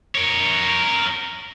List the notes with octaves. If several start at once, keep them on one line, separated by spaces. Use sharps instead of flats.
A#4 C#5